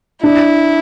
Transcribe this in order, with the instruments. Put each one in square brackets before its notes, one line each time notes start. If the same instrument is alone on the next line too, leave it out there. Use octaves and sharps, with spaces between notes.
[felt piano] D4 [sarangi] E4